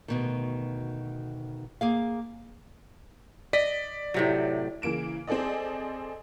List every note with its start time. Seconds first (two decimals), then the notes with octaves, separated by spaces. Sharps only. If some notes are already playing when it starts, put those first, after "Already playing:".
0.08 D2 B2 D#3
1.81 A#3 G#4 F5
3.53 D5 D#5 B6
4.14 A2 C3 F#3
4.82 C#3 E3 A#3 D7 E7
5.27 C4 G#4 A4 D5 D#5